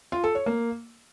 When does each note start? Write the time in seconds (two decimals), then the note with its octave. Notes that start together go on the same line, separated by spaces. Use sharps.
0.12 F4
0.24 A4
0.35 C#5
0.46 A#3